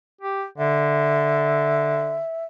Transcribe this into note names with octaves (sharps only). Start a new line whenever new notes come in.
G4
D3 E5